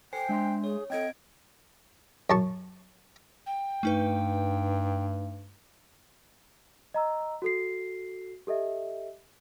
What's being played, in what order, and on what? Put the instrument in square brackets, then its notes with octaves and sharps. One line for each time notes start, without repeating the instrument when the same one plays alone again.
[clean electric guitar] A4 [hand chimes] C5 G#5 C7 [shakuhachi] G5
[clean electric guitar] G#3 E5 C6 [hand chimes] D4
[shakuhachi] G#4 [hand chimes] C#5
[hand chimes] C4 G#6 D7 [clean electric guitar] A4 G5 [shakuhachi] D#5
[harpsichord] F#2 A5 C#6
[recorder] G5
[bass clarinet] G2 [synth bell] A3 D#4 B4
[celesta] D#5 A#5 E6
F#4 A4 C7
G4 A4 D#5 E5